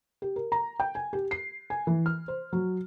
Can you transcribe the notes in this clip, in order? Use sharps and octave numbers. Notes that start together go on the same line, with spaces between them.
G4
A#4
A#5
G5
G#5
G4
C7
G#5
E3
F6
C5
F#3